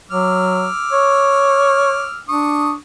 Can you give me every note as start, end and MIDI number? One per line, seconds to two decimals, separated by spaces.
0.11 0.69 54
0.11 2.20 86
0.11 2.20 88
0.11 2.20 89
0.92 2.05 73
2.29 2.76 62
2.29 2.72 85
2.29 2.72 87